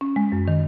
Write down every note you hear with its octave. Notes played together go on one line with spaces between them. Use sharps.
C#4
G#3
F#2
D#3